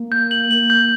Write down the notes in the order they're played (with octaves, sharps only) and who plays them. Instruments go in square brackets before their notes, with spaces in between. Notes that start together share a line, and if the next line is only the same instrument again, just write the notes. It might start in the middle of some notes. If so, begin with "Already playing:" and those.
Already playing: [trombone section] A#3
[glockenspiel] G6
F#7
[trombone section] A#3 [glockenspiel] F#7
[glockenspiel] G6